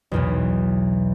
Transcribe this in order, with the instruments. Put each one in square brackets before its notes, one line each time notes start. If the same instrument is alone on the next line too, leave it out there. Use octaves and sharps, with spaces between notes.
[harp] B1 E2 B2